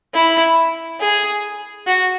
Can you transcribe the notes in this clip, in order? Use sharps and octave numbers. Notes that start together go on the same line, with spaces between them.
E4
G#4
F#4